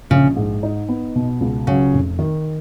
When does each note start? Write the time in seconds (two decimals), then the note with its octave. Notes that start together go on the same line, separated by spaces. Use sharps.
0.10 A#1 C#3
0.36 G#2
0.63 D#4
0.89 B3
1.16 B2
1.41 C#2
1.67 C#3 F#3
1.94 F1
2.19 D#3